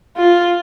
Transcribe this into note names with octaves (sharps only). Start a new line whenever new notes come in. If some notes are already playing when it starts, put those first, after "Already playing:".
F4